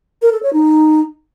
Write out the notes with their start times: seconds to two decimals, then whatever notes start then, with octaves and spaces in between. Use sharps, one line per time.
0.22 A#4
0.32 A4
0.43 C#5
0.53 D#4